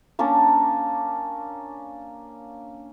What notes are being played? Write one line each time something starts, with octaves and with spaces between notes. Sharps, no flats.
A#3 C#4 D4 A#4